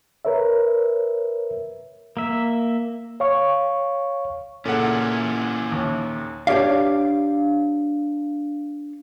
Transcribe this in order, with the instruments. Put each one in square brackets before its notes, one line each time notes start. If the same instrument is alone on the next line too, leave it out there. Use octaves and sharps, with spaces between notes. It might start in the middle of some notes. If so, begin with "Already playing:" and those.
[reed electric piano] A#4 B4 C#5 E5
[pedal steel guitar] A#3 E5
[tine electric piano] C#5 F5 C#6
[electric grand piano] A#2 C#3 A#3 [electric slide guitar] C#4 E4 [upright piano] A4 F#5
[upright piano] D#2
[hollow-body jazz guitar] D4 G4 C#5 D5 F5